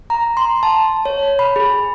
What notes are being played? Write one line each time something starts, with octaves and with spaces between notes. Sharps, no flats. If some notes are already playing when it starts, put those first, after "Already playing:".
A#5
C6
A5
C#5
B5
G#4